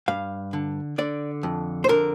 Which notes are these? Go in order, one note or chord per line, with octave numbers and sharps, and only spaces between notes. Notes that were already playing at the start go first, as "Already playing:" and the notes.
G2 F5
D3
D3 D5
F2
C5
D3 A#4